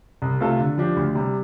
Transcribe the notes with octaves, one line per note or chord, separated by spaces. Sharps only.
C2
C3 A3 F4 A4
D3
F3 D4 G4
D2
C3 G3